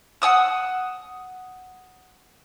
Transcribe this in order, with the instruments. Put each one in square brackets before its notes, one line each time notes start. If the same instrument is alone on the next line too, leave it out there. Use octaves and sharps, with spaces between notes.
[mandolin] F#5 G#5 D#6 E6